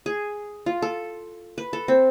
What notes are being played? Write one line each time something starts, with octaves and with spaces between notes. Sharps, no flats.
G#4
F4
A4
B4
A4
C4